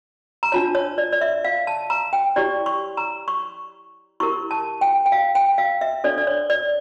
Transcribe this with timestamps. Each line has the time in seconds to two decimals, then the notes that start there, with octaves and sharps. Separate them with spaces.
0.43 A#5
0.52 D4 F4 C#5 A5
0.75 C#5
0.98 D5
1.13 D5
1.21 E5
1.45 F5
1.67 A5
1.90 A#5
2.13 G5
2.36 E4 G4 C#5 D5
2.66 C#6
2.97 A#5
3.28 C#6
4.20 E4 G4 A#4 C#6
4.51 A5
4.81 G5
5.06 G5
5.12 F5
5.35 G5
5.58 F5
5.81 E5
6.04 D4 A4 C#5 D5
6.18 D5
6.27 C#5
6.50 D5